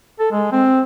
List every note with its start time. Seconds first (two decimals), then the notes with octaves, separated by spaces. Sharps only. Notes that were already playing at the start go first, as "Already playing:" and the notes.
0.19 A4
0.32 G#3
0.52 C4